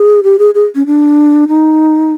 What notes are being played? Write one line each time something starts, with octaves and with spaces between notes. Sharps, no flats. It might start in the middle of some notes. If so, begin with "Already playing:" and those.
Already playing: G#4
G4
G#4
G#4
C#4
D4
D#4